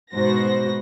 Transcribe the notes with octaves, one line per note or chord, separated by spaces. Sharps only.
G#2 B2 F#4 C5 A#6